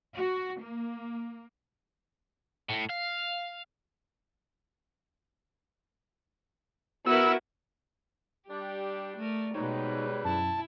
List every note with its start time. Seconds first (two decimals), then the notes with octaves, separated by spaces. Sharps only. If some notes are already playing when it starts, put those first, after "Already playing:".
0.15 F#4
0.61 A#3
2.69 A2
2.89 F5
7.07 B3 E4 F#4 A#4 E6
8.49 G3 D4 G4 D5
9.17 A3 A#4
9.54 G#2 B2 G3 G#3 D#4 B4 C#5
10.24 F#2 E4 A5